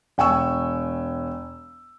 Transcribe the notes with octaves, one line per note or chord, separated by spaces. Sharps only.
E1 G5 G#5 C#6 E6